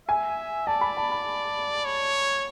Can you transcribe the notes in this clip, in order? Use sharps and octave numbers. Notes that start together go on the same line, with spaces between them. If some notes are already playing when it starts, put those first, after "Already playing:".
E5 G#5
D5 A5
B5
A5
B5
C#5